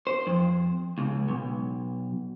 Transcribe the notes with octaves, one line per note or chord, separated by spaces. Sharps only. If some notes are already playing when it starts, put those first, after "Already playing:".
C5
F2
C#2
B1